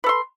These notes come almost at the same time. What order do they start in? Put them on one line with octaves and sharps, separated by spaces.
B4 A4 C6